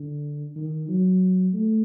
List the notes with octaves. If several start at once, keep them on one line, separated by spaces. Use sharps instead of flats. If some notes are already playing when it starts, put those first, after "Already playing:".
Already playing: D3
D#3
F#3
A3